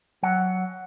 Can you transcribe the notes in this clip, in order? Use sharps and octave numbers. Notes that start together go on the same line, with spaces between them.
F#3 F#5